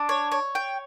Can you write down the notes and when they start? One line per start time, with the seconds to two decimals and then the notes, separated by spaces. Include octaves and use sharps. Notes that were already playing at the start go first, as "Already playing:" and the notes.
Already playing: D4
0.09 C#5
0.32 C#5
0.55 G5